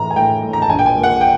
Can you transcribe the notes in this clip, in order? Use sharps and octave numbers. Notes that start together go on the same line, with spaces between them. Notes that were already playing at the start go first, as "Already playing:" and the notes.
Already playing: A2 E3 A#5
G#5
A2 G5
A2
A#5
A5
A#1 G#5
G5
G#5
A#2
F#5
G5